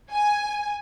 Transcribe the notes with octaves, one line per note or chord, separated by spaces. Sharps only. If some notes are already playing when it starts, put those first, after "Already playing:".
G#5